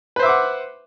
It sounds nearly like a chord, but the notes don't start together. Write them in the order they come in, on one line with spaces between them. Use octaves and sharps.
B4 C5 E5 D6 F#5